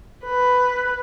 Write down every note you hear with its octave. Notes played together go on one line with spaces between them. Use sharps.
B4